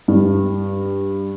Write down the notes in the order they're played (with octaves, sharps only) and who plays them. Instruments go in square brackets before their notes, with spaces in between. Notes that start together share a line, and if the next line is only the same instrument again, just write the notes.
[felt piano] G2